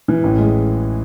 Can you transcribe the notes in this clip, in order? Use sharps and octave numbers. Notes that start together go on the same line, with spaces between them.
E3
A1
G#3